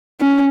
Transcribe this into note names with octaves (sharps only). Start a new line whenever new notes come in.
C#4